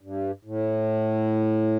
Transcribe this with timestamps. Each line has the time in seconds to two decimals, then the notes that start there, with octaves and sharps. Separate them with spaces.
0.01 G2
0.45 A2